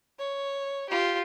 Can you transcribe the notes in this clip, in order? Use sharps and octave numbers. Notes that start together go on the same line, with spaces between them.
C#5
F4 G4